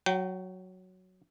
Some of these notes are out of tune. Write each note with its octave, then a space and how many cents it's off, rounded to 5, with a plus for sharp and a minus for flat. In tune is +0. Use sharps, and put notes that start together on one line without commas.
F#3 +0 G5 -30